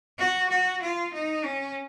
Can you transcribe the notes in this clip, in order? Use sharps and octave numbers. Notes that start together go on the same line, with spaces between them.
F#4
F#4
F4
D#4
C#4